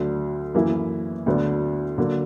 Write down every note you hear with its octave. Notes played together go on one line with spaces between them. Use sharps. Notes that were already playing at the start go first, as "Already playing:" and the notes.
Already playing: D2 D3 F#3
F#2 E3 A#3 E4
D2 D3 F#3 B3 D4
D3 F#3 A#3